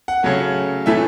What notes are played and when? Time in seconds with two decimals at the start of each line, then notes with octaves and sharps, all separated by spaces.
0.08 F#5
0.23 C#3 F#3 A3
0.86 A2 E3 A3 E5